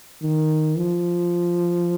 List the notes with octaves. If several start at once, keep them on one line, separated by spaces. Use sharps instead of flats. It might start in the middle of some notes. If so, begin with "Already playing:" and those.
D#3
F3